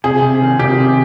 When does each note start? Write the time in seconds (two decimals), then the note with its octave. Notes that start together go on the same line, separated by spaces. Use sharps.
0.04 C3 G#4
0.22 C3
0.42 D#3
0.59 C3 G4
0.79 C3